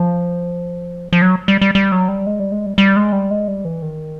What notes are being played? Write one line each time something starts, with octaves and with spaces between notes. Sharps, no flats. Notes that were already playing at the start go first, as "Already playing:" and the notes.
Already playing: F3
F3
F#3
G3
G3
G3
F#3
G3
G#3
G3
G#3
G3
G3
G#3
G3
G#3
G3
E3
D#3